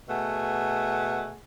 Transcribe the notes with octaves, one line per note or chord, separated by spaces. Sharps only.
B2 A3 G#4 F#5